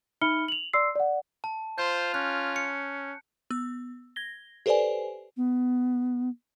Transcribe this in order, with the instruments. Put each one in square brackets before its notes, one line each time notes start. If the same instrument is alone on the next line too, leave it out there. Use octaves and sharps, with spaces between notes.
[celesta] D#4 E5 B5 F6 C#7 G7
F7 F#7
D5 C6 E6 C7
D5 F#5
[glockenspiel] A5
[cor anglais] F4 [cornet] C5 [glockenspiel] G6
[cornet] C#4 [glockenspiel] F#6
[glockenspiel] C#7
[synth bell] B3 E6
G#6 A#6 G7
G4 A4 B4 C5 D5 G#5
[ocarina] B3